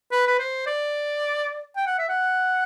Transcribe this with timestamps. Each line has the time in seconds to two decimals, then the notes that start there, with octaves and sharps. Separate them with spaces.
0.12 B4
0.28 B4
0.39 C5
0.66 D5
1.77 G5
1.87 F#5
1.98 E5
2.09 F#5